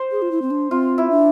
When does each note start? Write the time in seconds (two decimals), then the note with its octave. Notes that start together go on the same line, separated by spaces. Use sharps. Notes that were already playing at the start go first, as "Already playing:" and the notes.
Already playing: C5
0.12 G#4
0.22 F4
0.31 E4
0.42 C4
0.51 D4
0.71 C4 F4
0.98 E4
1.11 D4